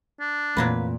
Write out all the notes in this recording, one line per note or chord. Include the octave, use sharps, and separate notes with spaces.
D4
F2 A#2 E3 F#3 A3 A#3 B4